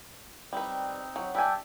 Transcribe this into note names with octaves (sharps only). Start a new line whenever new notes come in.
G3 C4 D#4 B4
F#3
G3 D4 E5 G5 G#5